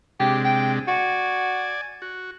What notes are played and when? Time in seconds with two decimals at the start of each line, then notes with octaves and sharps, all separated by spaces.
0.20 C3 G#3 D4 G4
0.45 G5
0.88 F#4 D5 G#5
2.02 F#4